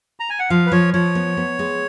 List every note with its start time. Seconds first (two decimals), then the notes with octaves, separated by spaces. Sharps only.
0.20 A#5
0.30 G#5
0.39 F#5
0.50 F3 F5
0.66 B4
0.72 F3 C#5
0.94 F3 C#5
1.15 B3
1.37 B3
1.59 G#3